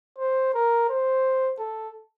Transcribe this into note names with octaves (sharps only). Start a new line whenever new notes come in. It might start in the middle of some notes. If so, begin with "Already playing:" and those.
C5
A#4
C5
A4